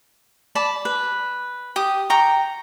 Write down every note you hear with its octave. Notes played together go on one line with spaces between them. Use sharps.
D5 A5 B5
B4
G4 D#6
G5 A#5 C#6